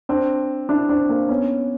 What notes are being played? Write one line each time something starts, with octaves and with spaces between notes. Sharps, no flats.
C4 D4
D4 E4
C4 D4
A#3 C4
B3 C#4